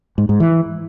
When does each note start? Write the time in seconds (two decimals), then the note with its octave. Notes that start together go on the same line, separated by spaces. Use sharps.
0.18 G#2
0.29 G#2
0.40 E3